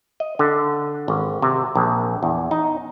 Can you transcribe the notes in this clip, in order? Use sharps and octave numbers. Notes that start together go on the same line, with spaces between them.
D#5
D3
G#1
C3
A#1
E2
D#4